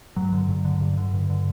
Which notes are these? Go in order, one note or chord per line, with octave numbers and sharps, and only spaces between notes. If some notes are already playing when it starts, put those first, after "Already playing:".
G2 F#3
D3
G2
D3
G2
D3
G2
D3